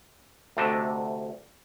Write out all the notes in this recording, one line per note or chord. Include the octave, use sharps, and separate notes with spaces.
D2 C3 A3 D4 D#5 A5